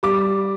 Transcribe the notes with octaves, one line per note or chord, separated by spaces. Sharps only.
G3 D6